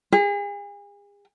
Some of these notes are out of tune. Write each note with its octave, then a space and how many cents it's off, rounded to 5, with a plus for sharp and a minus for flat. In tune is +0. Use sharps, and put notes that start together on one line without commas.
G#4 -40